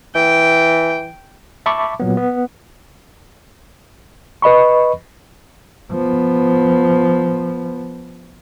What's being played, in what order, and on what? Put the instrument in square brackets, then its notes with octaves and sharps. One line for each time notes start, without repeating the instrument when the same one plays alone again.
[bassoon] E3 [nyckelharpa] G5
[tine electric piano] E5 A5 B5 C#6 D6
A#2 F#3 B3
B3
[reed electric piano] B4 D#5 B5 C#6
[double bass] F3 B3